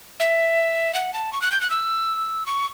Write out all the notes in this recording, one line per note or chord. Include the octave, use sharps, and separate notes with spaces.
E5
F#5
A5
C#6
F#6
G6
F#6
E6
C#6